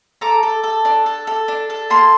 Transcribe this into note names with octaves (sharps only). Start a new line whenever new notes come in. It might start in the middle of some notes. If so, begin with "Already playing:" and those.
A4 A#5 D6
A4
A4
D4
A4
A4
D4
A4
A#3 A5 C6